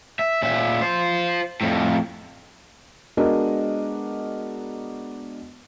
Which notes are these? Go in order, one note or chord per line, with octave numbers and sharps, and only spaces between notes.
E5
A#2 E5
F4 C5
F2 A2
G#3 B3 D4 F#4 A#4 D#5